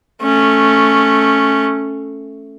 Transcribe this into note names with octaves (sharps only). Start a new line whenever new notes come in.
A3 C#4